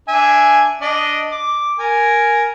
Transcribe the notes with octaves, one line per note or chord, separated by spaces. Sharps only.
D4 E5 G#5
D4 D#5
D6
A#4 G#5